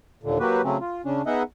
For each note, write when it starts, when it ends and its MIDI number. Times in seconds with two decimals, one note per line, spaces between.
0.23 0.38 39
0.23 0.38 46
0.23 0.38 50
0.40 0.61 54
0.40 0.61 58
0.40 0.61 66
0.40 0.61 67
0.40 0.61 71
0.63 0.77 49
0.63 0.77 54
0.63 0.77 57
0.63 0.77 60
0.63 0.77 61
0.81 1.02 65
1.05 1.22 49
1.05 1.22 61
1.05 1.22 62
1.26 1.43 59
1.26 1.43 63
1.26 1.43 68
1.26 1.43 75
1.26 1.43 76
1.26 1.43 78